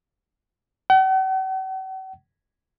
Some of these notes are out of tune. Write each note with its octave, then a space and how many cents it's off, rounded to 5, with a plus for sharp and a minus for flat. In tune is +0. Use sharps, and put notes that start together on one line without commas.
F#5 +45